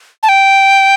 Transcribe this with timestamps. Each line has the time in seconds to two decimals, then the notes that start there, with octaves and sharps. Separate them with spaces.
0.23 A5
0.29 G5